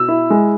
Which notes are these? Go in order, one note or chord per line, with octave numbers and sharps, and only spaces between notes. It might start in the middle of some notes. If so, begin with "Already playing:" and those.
Already playing: B2 E6
E4
G#3